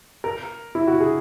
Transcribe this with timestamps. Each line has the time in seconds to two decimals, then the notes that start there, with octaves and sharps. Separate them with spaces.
0.24 A#4
0.75 E4
0.87 F#4
1.00 G#4